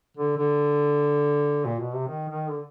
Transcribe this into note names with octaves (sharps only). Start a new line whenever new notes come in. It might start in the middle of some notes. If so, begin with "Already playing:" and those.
D3
D3
A#2
B2
C3
D#3
D#3
D3